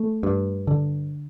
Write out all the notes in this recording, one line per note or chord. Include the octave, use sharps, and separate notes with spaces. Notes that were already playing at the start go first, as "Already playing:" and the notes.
Already playing: A3
G2
D3